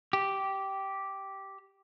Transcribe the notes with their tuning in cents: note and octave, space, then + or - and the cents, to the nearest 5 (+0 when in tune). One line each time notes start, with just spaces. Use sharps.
G4 -10